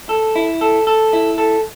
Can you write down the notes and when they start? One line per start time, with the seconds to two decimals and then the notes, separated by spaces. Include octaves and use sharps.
0.09 A4
0.36 E4
0.61 A4
0.87 A4
1.13 E4
1.38 A4